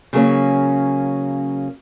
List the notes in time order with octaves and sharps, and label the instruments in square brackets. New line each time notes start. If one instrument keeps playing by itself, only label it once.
[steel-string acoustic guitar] C#3 F#3 A#3 C#4